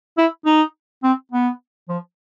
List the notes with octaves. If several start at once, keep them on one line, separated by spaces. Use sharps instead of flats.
E4
D#4
C4
B3
F3